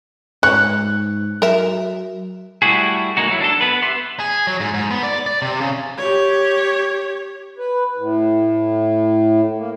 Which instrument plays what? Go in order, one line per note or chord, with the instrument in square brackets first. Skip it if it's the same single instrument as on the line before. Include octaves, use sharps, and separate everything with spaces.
[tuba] G#2 [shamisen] C#5 [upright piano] F#6
[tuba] F#3 [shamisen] A#4 E5
[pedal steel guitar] G3 A3 E4 F#4 G#4
G#3 A#3 D#4 F#4
F#3 E4
D4 A4
B3 B4
G4 E5 F#5 C6
[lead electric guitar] G#4
F#3
G#2
G#2
B3
D5
D5
C3
C#3
[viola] G4 C#5
[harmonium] B4
A2
A#3